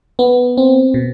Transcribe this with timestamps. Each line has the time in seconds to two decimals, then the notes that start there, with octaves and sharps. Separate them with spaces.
0.19 B3
0.57 C4
0.94 B2